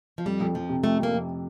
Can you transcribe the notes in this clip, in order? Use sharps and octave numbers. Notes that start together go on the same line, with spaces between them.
F3
F2 G3
F2
F2 F3
C3
F2 A3
F2
A#3
F2